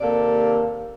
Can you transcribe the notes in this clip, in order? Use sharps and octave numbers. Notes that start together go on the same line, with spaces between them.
D#2 C3 A#3 A4 D5